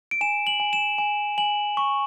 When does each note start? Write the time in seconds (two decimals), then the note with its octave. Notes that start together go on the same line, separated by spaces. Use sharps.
0.11 D7
0.21 G#5 E7
0.47 F#7
0.60 G#5
0.73 E7
0.98 G#5
1.38 G#5 F#7
1.77 C#6